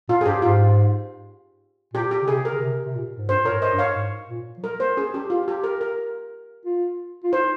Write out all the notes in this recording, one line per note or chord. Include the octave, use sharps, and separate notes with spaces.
A#2 F4
G#4
G2 G4
G#2 F4
A#2 G4
G4
C#3
C3 G#4
A#4
C#3
C3
C3
A#2
G#2
G2 C5
A#2 A#4 C#5
G#2
C5 D#5
G2
C#5 F5
G#2
A#2
F3
G3 A#4
A#3 C5
C#4 G#4
C#4 G4
F4
G4
A#4
A#4
F4
F4
D#4 C5